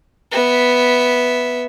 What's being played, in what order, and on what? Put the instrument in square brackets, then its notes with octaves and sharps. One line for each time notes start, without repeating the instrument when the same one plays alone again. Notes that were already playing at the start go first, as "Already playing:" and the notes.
[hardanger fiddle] B3 E5